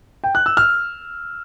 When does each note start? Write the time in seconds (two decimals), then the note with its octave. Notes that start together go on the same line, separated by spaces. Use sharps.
0.24 G5
0.35 F#6
0.46 E6
0.57 F6